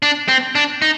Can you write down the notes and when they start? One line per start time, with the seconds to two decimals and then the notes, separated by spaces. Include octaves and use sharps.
0.03 D4
0.28 C4
0.55 D4
0.82 D#4